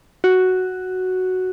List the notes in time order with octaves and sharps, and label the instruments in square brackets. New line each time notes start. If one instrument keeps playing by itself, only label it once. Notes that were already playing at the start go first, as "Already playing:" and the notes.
[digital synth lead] F#4